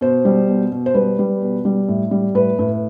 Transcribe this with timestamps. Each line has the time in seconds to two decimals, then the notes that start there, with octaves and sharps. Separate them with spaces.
0.01 B2 C5
0.25 G3
0.48 B2
0.72 B2
0.86 C5
0.94 G3 B4
1.19 G3
1.42 B2
1.65 G3
1.89 A2
2.11 G3
2.35 A2 B4
2.59 A2